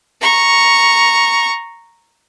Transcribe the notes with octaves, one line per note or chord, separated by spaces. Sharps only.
A#5 C#6